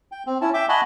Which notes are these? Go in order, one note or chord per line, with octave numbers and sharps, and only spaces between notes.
G5
C4
C#4 E4 A5
E5 G5 D6
D#5 F#5 G#5 A5 B5 C#6